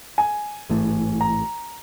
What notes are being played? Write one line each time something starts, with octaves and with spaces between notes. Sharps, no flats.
G#5
A1 G#2 E3 A3
A#5